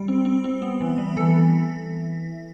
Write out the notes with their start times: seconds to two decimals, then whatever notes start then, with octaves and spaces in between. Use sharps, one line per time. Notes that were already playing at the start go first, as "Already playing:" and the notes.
Already playing: G3
0.08 C4
0.25 C4
0.44 C4
0.62 B3
0.81 E3
0.98 G3
1.17 E3 A4